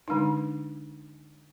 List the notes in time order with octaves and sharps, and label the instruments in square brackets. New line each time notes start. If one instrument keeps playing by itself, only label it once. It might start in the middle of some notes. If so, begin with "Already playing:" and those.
[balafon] D3 G#3 D4 D#4